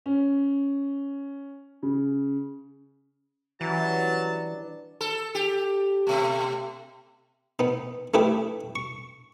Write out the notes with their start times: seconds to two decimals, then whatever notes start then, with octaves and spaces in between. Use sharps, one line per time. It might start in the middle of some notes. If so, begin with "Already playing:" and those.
0.06 C#4
1.83 C#3
3.61 E3 F#3 G3 C#4 A5
4.09 D4
5.01 A4
5.35 G4
6.07 B2 A3
7.59 B3 D#4
8.14 A3 D#4 E4 G4 B4
8.76 C#6